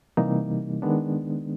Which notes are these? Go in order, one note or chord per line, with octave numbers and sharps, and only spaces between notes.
C3 E3 G3 A#3 D#4
D#3 G#3 B3 D4